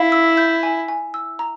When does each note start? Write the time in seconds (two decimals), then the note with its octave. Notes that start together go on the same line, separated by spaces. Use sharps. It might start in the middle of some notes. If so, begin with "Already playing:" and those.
Already playing: E4 F5
0.12 E6
0.37 G6
0.63 G#5
0.88 G#5
1.14 E6
1.39 A#5